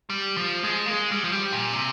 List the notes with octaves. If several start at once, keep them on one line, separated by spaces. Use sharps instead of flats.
G3
F3
G#3
A#3
G#3
G3
F3
G3
A#2
C3